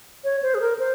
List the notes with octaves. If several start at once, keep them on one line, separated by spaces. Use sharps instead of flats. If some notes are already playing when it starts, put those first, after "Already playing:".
C#5
C5
G#4
A#4
C5